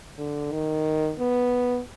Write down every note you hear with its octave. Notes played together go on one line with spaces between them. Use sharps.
D3
D#3
B3